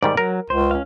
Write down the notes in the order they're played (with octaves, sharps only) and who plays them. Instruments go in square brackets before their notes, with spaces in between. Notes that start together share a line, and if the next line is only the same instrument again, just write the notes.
[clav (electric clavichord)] G#2 D#3 G3 [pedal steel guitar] D5
[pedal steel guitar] F#3 [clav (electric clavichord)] A#4
[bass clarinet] C#2 [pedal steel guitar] C5
[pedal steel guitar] C#4 F5